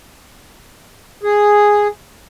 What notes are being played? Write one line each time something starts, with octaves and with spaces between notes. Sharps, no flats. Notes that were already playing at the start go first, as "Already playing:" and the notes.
G#4